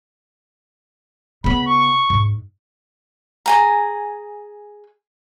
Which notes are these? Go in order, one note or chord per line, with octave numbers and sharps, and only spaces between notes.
C#3 B3 B5
C#6
G#2
G#4 G#5 A#5